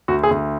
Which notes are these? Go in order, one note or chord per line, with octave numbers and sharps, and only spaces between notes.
D2 F#4
G#4
D2